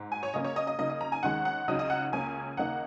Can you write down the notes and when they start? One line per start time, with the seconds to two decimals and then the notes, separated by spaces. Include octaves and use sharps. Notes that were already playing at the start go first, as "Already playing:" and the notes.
Already playing: G#2
0.12 G#5
0.23 C#5
0.33 C#3 A#3 C#4 D#5
0.44 C#5
0.56 D#5
0.67 D#5
0.79 C#3 A#3 D#4 D#5
0.90 D#5
1.01 A#5
1.12 G#5
1.23 D#2 D#3 G#3 C#4 F#5
1.45 F#5
1.68 C#2 C#3 F#3 D#4 D#5
1.79 D#5
1.90 F#5
2.12 C#2 C#3 A#3 C#4 G#5
2.57 D#2 C#3 A#3 D#4 F#5